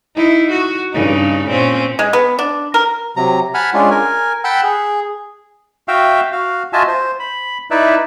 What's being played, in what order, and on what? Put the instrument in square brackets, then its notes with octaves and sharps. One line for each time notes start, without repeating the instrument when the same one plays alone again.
[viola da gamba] D#4 E4
F#4
G2 C#3 D#4
A#2 C4 C#4
[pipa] G#3
B3
D4
A#4
[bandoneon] C3 F#3 A#5
F#5 G#5 A5 B5 F6
G#3 C#4 D4 F4
A#4 G#5
F#5 G5 A5 B5 E6 F#6
G#4
[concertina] F#4 E5 F5 G5
F#4 F5
F4 F#4 D#5 E5 G#5 A5
C5
B5
D#4 E4 B4 D5 E5